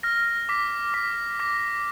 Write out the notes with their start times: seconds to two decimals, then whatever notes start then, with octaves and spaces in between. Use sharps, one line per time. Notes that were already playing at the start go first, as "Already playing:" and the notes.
0.03 F6 A#6
0.49 D6 B6
0.94 D6 B6
1.40 D6 A#6